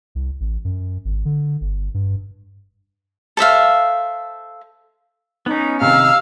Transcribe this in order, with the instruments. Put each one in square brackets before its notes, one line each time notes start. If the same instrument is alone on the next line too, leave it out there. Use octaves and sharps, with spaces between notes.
[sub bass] C2
A1
F#2
G#1
D3
G1
G2
[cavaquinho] A4 C5 E5 F5
[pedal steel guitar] B3 C#4 [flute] D#4
[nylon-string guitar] C3 D#3 [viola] F5 [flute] E6